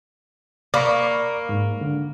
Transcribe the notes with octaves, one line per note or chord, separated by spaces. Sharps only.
A#3 D5 B5 C#6
G#2
D3